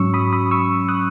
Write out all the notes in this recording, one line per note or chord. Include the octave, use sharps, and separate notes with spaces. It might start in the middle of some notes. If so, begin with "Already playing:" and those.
Already playing: G#2 F#3 C#4 C#6 E6
B5 D#6
B5 D#6
C#6 E6
D#6 F#6